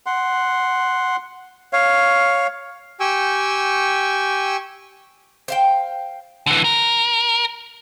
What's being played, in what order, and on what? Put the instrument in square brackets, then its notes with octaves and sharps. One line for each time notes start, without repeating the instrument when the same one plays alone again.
[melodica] F#5 C6
C#5 F5
[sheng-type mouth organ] G4 G5 G#5 C#6 E6
[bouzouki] C5 F5 G5
[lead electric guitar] D3 E3
A#4